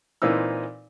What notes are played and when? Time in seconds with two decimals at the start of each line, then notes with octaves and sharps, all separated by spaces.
0.22 A#2 E3 C4 D#4 E6